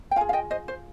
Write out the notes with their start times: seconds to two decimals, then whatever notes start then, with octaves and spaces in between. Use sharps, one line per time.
0.11 G5
0.16 F4 F5 G#5
0.21 G#4
0.29 F5
0.33 D#5 G5
0.51 C5 D#5
0.68 C5